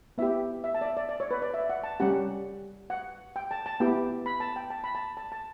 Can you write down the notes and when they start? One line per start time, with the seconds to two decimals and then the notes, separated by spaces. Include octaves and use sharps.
0.18 B3 E4 G4 E5
0.64 E5
0.74 A5
0.81 D5
0.86 E5
0.97 D5
1.09 D5
1.20 C#5
1.31 B4
1.42 D5
1.54 E5
1.70 F#5
1.84 A5
2.00 G3 C#4 G4 F#5
2.90 F#5
3.36 G5
3.51 A5
3.66 A5
3.80 B3 E4 G4 G5
4.26 B5
4.40 A5
4.56 G5
4.70 A5
4.84 B5
4.95 A5
5.17 A5
5.32 A5